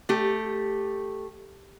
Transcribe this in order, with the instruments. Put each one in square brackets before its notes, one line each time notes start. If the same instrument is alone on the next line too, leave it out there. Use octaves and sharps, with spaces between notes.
[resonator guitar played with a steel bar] A3 G4